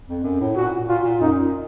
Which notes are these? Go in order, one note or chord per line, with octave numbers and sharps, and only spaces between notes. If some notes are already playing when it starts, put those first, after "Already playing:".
F2
F#2
A2
A#2 F#4
A#2 F4
A#2
F#2 D#4